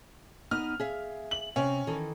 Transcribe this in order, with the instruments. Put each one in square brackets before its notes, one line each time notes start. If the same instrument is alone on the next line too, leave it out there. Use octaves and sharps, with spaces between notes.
[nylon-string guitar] B3 D#4 [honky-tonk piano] F6
[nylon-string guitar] G#4 E5 F5
[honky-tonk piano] F#7
[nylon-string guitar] C3 [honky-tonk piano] C#4
[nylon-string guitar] D#3 E3 A4